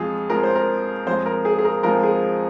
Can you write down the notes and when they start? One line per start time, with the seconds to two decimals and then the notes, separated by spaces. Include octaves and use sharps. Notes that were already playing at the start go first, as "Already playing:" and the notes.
Already playing: F2 F3 G#3 F4 G#4
0.30 F2 F3 G#3 A#4
0.43 C5
0.55 A#4
1.07 F2 F3 G#3 C5
1.26 A#4
1.45 G#4
1.59 G#4
1.65 A#4
1.83 F2 F3 G#3 A#4
2.03 G#4